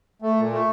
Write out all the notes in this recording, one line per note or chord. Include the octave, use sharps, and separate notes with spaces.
A3
A#2
A3